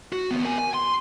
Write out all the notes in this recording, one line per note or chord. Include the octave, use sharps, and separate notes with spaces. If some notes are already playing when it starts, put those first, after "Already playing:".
F#4
D#2 B3
A#4 G#5
G#5
C6